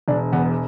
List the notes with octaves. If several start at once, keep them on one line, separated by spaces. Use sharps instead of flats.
E1 D4
E2 B3